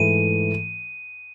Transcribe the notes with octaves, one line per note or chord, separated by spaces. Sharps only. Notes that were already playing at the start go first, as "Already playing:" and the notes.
Already playing: G#2 E3 A3 D#7